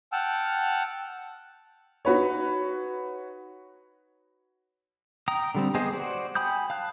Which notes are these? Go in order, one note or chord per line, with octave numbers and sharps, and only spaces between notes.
F#5 G5 A5 E6 F6
D#4 F#4 B4 C#5
G5 A#5 D#6
D3 G3 C4
B3 G4 G#4 C5 D#5
F#4 C5 D5
G5 G#5 B5 D#6 G6
F5 A5 F#6